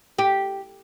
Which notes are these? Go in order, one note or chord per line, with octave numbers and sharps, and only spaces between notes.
G4